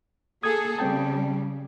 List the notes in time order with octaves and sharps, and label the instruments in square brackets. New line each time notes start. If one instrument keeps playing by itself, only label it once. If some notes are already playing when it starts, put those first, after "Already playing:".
[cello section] A#3 G#4 A4 [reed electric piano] D#6 G#6
[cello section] C#3 G3 [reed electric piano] C4 G5 A5